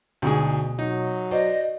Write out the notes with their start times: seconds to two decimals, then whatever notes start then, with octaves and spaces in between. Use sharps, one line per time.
0.22 D2 G#2 B2 G#4
0.79 F#3 D#4
1.31 F#4 C5 D5 D#5